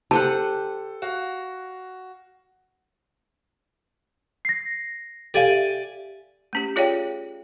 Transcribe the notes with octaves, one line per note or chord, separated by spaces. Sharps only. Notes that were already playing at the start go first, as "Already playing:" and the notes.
G4 A4 C5 F#5 A5
F#4 F5
A#6 C7
G4 A4 D5 F5 G#5
E5
A3 C#4 G4
F4 G#4 C#5 D5 F5 G5